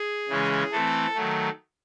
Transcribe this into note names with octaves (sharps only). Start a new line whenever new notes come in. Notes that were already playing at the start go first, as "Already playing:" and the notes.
Already playing: G#4
C#3 E3 G#3 C#4
E3 A3 C4 A4
D#3 F#3 A3